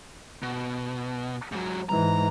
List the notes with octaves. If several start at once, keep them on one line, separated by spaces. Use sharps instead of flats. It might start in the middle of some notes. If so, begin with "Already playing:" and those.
B2
G#2 F#3
G#2 E3 A#5